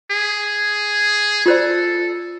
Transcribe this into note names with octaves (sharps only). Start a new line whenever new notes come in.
G#4
F4 A4 C5 D5